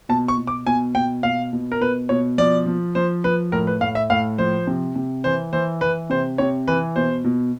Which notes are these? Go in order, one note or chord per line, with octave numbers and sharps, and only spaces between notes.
B2 A5
C#6
B2
D6
B2 G#5
B2 G5
B2 F5
B2
A#4
B2 B4
B2 C#5
F3 D5
F3
F3 C5
F3 B4
A2 A#4
B4
A2 F5
E5
A2 F5
F3 C5
C3
C3
E3 C5
E3 C5
E3 B4
C3 C5
C3 C#5
E3 B4
B2 C5
B2